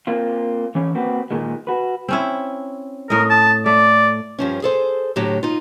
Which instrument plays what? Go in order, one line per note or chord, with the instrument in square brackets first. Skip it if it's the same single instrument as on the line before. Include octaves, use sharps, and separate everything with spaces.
[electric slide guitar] A#3 C4 F4
E3 C#4 C#5
A#3 C4 F#4 B4
A#2 D#3 G#3
F#4 B4
[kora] C4 C#4 E4
[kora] A2 D#5 [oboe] A#4
[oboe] A5
[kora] A3 [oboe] D5
[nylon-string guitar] G2 F3 C#4
G#4 A4 C5
A2 D3 F#3 G4
D#4 F4